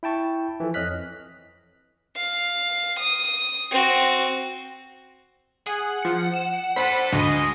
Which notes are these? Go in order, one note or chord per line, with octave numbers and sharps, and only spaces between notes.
E4 G5 A5 C#6
E3 F3 A4
F2 C#5 D#5 F6 F#6 B6
F5
D#6
C4 F#4
G#4 F#5
F3 C#7
E7
D4 A4 B4 C5 B5 B6
D2 G#3 D#5